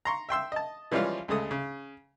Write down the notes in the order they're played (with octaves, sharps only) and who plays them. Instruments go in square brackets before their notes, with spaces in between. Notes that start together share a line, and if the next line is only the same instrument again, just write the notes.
[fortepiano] A#5 C6 C#6
E5 G5 C6 E6
D#5 A5
E3 F3 G3 G#3 C#4 F4
D2 C#3 G#3 A4 D#6
C#3